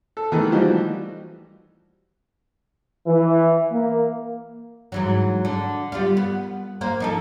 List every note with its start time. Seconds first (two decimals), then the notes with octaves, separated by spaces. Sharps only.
0.17 A4
0.32 D#3 E3 G#3 A3
0.52 E3 F3 G3 D#4 F#4
3.07 E3
3.71 A#3
4.92 G#2 E3 F#3
5.45 D3
5.92 G3 B3 F4
6.17 B3
6.81 A#3 C5
7.00 F3 D#4 A4